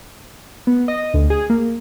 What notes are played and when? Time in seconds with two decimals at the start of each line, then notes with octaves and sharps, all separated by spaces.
0.67 B3
0.88 D#5
1.14 D2
1.30 G#4
1.50 A#3